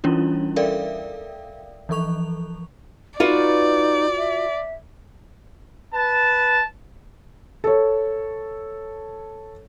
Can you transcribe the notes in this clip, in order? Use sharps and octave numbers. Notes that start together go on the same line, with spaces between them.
E3 G3 C#4 D4 E4 F4
A4 A#4 D5 E5 F5 G5
E3 F3 A4 C#6 F7
D#4 F4 F#4 B4 D5
E5
B4 A5
A4 C#5